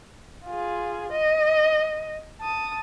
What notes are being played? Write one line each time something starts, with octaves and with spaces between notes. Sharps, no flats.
F4 G#4
D#5
A5 D#6